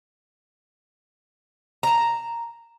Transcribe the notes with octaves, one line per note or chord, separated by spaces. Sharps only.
A5 A#5